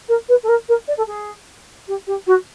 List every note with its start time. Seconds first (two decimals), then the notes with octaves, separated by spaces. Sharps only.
0.08 A#4
0.28 B4
0.43 A4
0.48 A#4
0.68 A#4
0.87 D5
0.97 A4
1.07 G#4
1.88 G4
2.07 G4
2.26 F#4